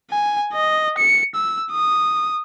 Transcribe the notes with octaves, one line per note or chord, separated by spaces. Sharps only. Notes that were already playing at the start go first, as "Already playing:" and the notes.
G#5
D#5
C#7
E6
D#6